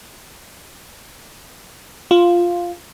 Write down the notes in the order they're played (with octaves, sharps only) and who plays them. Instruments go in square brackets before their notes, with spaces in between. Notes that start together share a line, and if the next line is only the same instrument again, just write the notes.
[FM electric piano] F4